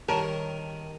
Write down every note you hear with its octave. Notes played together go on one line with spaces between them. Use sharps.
D#3 G3 A#4 C#5 A5